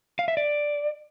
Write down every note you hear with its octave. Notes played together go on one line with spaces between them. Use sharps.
F5
E5
D5